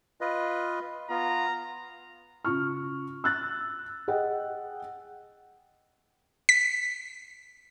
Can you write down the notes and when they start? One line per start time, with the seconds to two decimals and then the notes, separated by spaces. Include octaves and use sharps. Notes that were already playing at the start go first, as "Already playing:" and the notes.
0.21 F4 B4 D#5
1.10 B3 F4 A#5
2.45 C#3 F4 C#6 F6
3.24 E6 F#6 A6
4.08 G#4 D#5 F#5 G5
6.49 B6